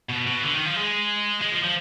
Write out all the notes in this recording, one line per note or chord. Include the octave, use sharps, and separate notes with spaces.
B2
B2
D3
D#3
F3
G#3
G#3
F3
F3